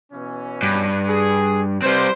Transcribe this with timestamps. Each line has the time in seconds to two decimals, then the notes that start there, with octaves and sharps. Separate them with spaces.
0.12 B2 E3 C#4
0.63 G2
1.08 G#4
1.82 G3 C4 B4 C5